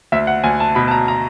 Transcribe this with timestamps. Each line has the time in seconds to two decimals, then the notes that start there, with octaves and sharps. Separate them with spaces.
0.12 D2 E5
0.27 F#5
0.44 D2 G#5
0.60 A5
0.75 B2 B5
0.88 A5
0.91 A#5
1.08 A#5